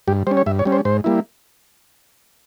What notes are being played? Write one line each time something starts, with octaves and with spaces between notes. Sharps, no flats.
G2 G4
G3 C#4 C5
C#5
G2 E5
C#5
G3 C#4
C5
G#2 C5
G3 A#3 E4